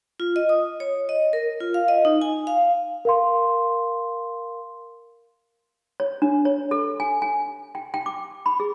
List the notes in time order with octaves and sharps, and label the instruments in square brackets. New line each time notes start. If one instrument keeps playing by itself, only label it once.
[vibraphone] F4
D#5
D#6
C#5
D#5
A#4
F4
F5
D#5
D#4
G#5
F5
[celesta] A#4 F5 C6
[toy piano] C#5
D4
C#5
A4
G#5
G#5
G5
G5
D6
B5
G#4